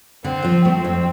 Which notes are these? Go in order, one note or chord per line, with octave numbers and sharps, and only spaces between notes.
D3 C4
F3
A3 C4
F2